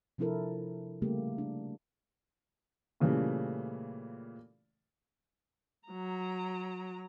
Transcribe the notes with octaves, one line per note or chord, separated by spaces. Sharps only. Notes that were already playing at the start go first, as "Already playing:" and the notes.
C3 F3 D4 E4 A4 A#4
C#3 G3 A3 A#3 G4
D4
A#2 C#3 E3 G3 A3
F#3 A#5